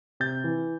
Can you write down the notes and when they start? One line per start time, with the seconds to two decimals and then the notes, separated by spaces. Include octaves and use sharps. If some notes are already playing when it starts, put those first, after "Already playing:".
0.20 C3 G6 A6
0.44 E3